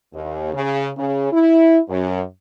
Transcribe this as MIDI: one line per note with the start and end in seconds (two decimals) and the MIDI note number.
0.13 0.52 39
0.53 0.89 49
0.97 1.30 49
1.32 1.79 64
1.89 2.22 42